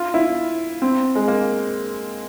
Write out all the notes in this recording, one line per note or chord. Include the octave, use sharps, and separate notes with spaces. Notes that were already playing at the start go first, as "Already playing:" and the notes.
Already playing: F4
E4
C4
G#3
A#3